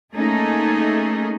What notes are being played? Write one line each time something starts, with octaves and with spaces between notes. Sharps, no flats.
A3 A#3 C#4 D#4 G#4 A4